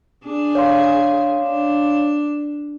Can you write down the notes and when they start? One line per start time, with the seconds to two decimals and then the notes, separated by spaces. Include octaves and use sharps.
0.25 D4 G#4
0.55 C#5 F5 C6
1.39 D4